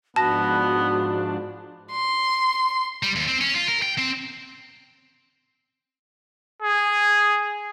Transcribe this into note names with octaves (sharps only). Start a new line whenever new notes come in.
G#2 F3 B3 D4 F#4 A5 A#6
C6
G3
D#2
C4
C#4
F4
A#4
G5
C4
G#4